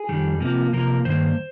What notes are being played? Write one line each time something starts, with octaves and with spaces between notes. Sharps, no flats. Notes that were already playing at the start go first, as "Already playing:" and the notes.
Already playing: G#4
F2 D#3 G3
C3 F3 A#3
C3 F3 A#3 A#4
G2 D#3 A#3 C5